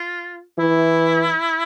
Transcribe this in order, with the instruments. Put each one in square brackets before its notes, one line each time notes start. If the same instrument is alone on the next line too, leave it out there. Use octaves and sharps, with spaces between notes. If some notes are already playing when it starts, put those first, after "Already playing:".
Already playing: [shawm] F4
[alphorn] E3 [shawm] E4